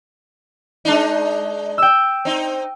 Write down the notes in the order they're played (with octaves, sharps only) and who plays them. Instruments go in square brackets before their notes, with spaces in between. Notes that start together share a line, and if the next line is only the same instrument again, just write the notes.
[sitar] G#3 D4 D#4
[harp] G5 E6
[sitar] C4 D#4